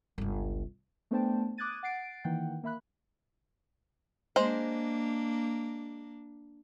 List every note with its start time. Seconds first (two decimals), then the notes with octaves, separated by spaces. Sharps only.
0.18 G1 C#2
1.11 A3 B3 D4 C5 G5 A5
1.58 D6 D#6 F#6 G#6 A6 D#7
1.83 F#5 A6 C7 D7
2.24 D#3 E3 A#3 F#5 G5
2.63 A#3 E5 B5 F#6
4.36 G#3 A#3 D4 C5